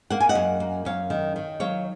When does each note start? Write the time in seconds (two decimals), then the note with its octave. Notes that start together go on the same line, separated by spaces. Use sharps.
0.10 A#3 F#5
0.20 G#5
0.29 D#5 F#5
0.35 F#2
0.60 A#3
0.85 F#2 C#5 F5
1.10 D#3
1.36 D#3
1.60 F#3 C#5 F5